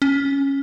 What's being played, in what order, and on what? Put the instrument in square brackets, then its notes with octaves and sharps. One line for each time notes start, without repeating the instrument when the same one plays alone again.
[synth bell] C#4